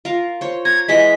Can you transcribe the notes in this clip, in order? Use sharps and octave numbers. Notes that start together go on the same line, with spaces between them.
F4 A#4 F5
C5 C#5
A#5 G#6
E3 G#3 D#5 B6